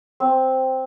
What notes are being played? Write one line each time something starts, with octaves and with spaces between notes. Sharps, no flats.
C4